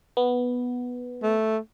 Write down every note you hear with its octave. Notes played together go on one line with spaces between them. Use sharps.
B3
A3